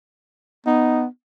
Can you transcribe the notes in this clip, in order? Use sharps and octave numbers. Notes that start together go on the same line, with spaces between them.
B3 D#4